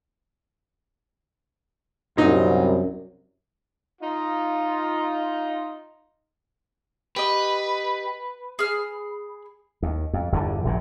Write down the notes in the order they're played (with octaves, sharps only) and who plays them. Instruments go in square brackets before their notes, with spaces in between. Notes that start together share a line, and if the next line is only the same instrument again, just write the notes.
[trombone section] C2 F#2 [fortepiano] A#2 D#4
[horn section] D#4 F4
[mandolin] G4 D#5 [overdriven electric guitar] B4
[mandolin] G#4 F6
[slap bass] D#2
F2
G1 E2 A#2 D3
A#1 F#2 A#2